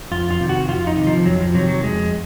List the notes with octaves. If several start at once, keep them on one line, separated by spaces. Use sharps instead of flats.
F2 F4
F4
C3 D#3
F#4
F2 F4
D#4
C3 D#3
F3
F2 F#3
F3
C3 D#3 F#3
F#3
F2 G#3